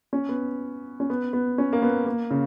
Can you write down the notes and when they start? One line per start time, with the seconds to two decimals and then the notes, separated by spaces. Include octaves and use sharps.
0.13 C#4
0.29 B3
1.00 C#4
1.10 B3
1.33 B3
1.58 C#4
1.73 A#3
1.82 B3
2.07 A#3
2.30 C#3